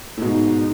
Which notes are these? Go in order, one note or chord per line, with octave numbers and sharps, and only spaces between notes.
A2
G#2 B2 D#4